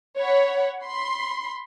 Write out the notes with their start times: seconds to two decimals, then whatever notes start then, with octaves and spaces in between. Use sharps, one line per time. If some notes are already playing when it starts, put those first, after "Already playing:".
0.17 C#5 F#5 B5
0.84 B5 C6